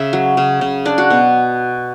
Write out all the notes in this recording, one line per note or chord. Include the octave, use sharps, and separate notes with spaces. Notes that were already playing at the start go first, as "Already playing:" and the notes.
Already playing: C#3 E5
F#3
C#3
C#3
D4 D5
F#4
B2